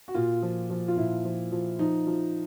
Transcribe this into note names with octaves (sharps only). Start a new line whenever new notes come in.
F#4
A#2 F4
F3
F3
F4
A#2 E4
F3
F3
F3 D#4
F3